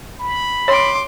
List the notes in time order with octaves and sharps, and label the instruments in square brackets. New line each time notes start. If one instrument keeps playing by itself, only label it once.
[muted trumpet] B5
[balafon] C#5 [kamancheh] C6 D6